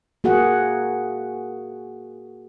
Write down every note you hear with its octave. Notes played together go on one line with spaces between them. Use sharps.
A#3 F#4 G#4 F#5